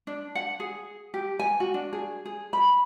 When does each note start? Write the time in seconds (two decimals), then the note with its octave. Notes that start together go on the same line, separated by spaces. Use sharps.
0.07 D4
0.35 F#5
0.60 G#4
1.14 G4
1.39 G#5
1.60 F#4
1.74 D4
1.93 G#4
2.25 G#4
2.53 B5